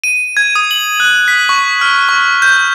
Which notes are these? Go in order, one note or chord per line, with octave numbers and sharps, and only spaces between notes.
D#7
G#6
D#6
F#7
F#6
B6
C#6
F6
C#6
G6